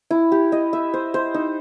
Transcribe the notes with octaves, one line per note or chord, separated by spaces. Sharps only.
E4
G4
D#5
E5
C5
C5
D#4